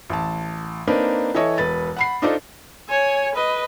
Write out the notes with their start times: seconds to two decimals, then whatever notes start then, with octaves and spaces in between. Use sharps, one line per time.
0.10 A1 A5
0.87 A#3 C4 D4 D#4 B4
1.34 E3 E4 A4 C#5 D#5
1.58 E1 B4 A6
1.96 F#5 B5 C7
2.22 D4 D#4 F4 A4 C5 D5
2.89 C#5 G#5
3.34 B4 D#5